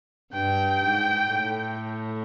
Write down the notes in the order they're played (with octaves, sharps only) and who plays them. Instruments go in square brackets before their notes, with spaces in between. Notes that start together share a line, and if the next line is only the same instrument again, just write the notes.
[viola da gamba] G2 [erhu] G5
[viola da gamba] G#2
A2